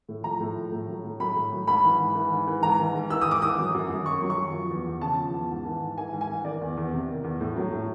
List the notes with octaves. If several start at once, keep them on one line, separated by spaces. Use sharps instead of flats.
A2
F3 A#5
A2
F3
A2
F#3
A2
F#3 B5
A2
F#3
G#2 B5
E3
G#2
E3
G#2
E3
G#2 A#5
E3
G#2
E3 E6
D#6
G#2 D6
E3 D#6
F#3
F#2
F#2
D#3 C#6
F#3
C#6
F#2
F3
E2
E2
C#3 A5
F3
E2
G#2
E3
G#2
E3 G#5
G#2
G#5
E3
D#3 D5
E2
E2
C3
D#3
E2
A2
F#3
A2